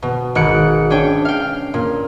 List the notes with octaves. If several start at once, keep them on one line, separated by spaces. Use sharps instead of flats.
B2
G#1 G#2 F#6 C#7 D7
C#4 D4 C#5 G5
F5 G5
A#2